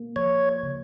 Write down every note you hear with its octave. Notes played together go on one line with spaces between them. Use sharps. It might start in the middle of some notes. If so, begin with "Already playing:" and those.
Already playing: A#3
F3 C#5
C#3